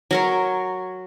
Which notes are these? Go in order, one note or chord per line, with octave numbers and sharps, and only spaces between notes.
F#3 A#4 C#5